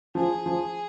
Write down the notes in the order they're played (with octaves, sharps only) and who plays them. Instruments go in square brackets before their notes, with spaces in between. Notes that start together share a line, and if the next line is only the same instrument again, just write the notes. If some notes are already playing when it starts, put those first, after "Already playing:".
[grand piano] F3 [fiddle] G#4
[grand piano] F3